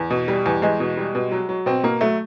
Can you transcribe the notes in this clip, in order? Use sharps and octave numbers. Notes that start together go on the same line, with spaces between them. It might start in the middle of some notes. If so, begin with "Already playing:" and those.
Already playing: E2
B2
G3
E2
E2 G#3
B2
G3
B2
F#3
F#3
B2 C4
B2 A#3
F#3 A3